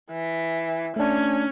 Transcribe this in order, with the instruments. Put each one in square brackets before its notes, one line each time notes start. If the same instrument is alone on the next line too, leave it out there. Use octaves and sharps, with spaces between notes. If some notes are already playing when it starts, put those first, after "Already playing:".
[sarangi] E3
[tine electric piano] A3 D4 [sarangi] C#4